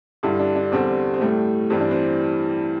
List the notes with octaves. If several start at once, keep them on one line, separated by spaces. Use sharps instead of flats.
G2 D3 G3 E4
D4
D4
E2 D3 G3 C4
C4
A2 G3 A3
G2 E3 G3 C4
D4
C4